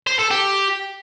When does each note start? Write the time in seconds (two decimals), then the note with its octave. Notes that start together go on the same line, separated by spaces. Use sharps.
0.07 C5
0.19 A4
0.31 G4